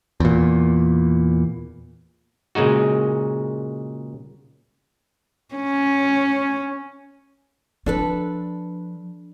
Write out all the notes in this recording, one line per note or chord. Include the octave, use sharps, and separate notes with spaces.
E2 A#2
A#2 C#3 G#3 D#4 F#4
C#4
F3 D4 A4 B4